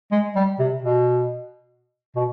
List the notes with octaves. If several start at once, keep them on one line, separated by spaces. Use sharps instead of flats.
G#3
G3
C3
B2
B2